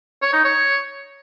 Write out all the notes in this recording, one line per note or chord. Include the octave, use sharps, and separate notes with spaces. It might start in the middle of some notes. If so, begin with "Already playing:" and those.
C#5
D#4
C#5